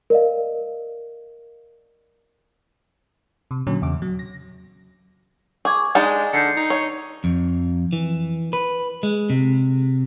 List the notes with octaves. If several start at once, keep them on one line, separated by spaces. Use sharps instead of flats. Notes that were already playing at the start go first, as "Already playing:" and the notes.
A#4 D5 D#5 F5
C3
A#2 D3 F#3 C#4
E2 C#3 D6
F#3
A#6
G#4 C#6 D6 G#6
G#3 D4 D#4 G#4 A6
D3 G6 C7 C#7
D#4
C#5
F2
E3
B4
G#3
C3